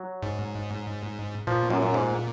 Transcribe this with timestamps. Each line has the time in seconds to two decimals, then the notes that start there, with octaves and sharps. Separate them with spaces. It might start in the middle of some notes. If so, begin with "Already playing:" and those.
Already playing: F#3
0.23 G#2
1.47 A#2 F3
1.70 F#2
1.82 F#2
1.94 G#2